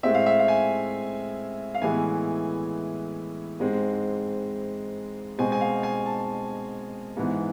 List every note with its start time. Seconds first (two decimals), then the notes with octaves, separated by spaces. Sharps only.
0.03 A2 G#3 C4 E5
0.15 F5
0.26 E5
0.39 F5
0.48 G#5
1.75 F5
1.82 A2 E3 G#3 B3 G#5
3.60 G#2 G#3 C4
5.38 B2 G#3 C4 G#5
5.52 G#5
5.61 F5
5.83 G#5
6.06 A5
7.17 G#2 E3 B3